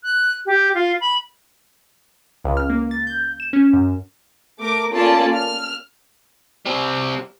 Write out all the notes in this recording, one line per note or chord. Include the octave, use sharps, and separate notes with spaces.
F#6
G4
F4
B5
C#2
F6
A#3
A6
G6
E7
C#4
F#2
A3 A#4 D6
A#3 C#4 F4 A4 D5 A5
F6
G3 C4